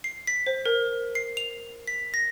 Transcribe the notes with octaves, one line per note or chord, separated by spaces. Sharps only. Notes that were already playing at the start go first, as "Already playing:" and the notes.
C7
B6
C5
A#4
C7
F7
B6
A#6